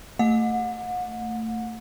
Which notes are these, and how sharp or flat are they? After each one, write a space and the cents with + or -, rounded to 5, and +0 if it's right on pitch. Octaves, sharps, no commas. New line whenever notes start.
A3 +25 F#5 -35